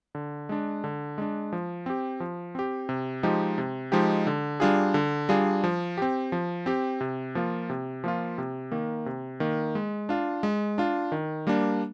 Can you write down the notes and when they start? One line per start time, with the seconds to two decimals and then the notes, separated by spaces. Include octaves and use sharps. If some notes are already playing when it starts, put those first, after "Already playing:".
0.15 D3
0.49 G#3 D4
0.84 D3
1.18 G#3 D4
1.53 F3
1.86 C4 G4
2.20 F3
2.55 C4 G4
2.89 C3
3.23 F3 G#3 D#4 G4
3.58 C3
3.92 F3 G#3 D#4 G4
4.27 D3
4.60 G3 D4 F4 G#4
4.94 D3
5.29 G3 D4 F4 G#4
5.64 F3
5.97 C4 G4
6.32 F3
6.66 C4 G4
7.01 C3
7.35 F3 A#3 F4
7.70 C3
8.04 F3 A#3 F4
8.38 C3
8.72 D#3 A#3
9.06 C3
9.40 D#3 A#3
9.75 G#3
10.09 D4 F4
10.43 G#3
10.78 D4 F4
11.12 D#3
11.47 G3 A#3 D4